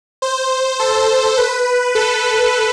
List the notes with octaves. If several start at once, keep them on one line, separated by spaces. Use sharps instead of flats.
C5
A4
B4
A4